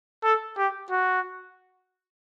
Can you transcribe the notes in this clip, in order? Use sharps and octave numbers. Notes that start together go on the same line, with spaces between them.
A4
G4
F#4